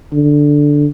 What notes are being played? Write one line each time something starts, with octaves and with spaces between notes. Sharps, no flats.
D3